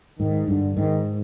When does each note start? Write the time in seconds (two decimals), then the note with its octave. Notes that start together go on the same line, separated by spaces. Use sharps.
0.19 G#2 D#3
0.48 G2 D3
0.76 G#2 D#3